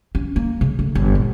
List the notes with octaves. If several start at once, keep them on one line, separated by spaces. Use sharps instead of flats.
C#4
A#3
C#3
A3
G1
A#2